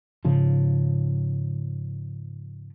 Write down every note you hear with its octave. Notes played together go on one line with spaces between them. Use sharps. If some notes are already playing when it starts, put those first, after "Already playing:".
G#2 C#3 F3